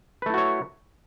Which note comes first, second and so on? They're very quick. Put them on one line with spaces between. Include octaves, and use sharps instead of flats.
B4 A3 E4 F#4 C#5